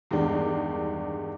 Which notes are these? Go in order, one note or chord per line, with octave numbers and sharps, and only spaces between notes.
E2 G2 D#3 G#3 D4